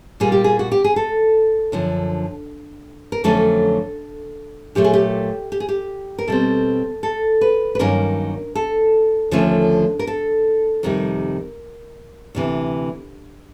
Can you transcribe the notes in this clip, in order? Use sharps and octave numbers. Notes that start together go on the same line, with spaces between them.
A#2 G3 A#3 G#4
G4
G#4
F#4
G4
G#4
A4
F#2 D3 F3
A#4
F2 D3 F#3 A3 C#4 A4
A#2 F#3 A3 G4
G#4
G4
G4
G#4
G4
A#4
B2 G3 C4 A4
A4
B4
B4
G2 D#3 F#3 A#3 C#4 A#4
A4
D#2 D3 F3 A3 C#4
A#4
A4
F2 C3 D#3 G3 A#4
D2 C3 E3